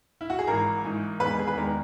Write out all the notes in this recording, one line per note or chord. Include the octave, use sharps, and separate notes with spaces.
E4
F#4
G#4
G#1 G#2 E3 A#4
G#1 G#2 E3
E1 E2 D#3 G#3 B4
G#4
B4
E1 E2 D#3 G#3 A#4